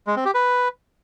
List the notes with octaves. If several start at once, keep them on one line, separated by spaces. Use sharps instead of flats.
G#3
C4
G4
B4